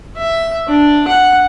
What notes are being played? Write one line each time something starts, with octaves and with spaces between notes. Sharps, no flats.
E5
D4
F#5